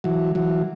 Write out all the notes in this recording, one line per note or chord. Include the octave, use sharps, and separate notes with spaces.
E3 F#3
E3 F#3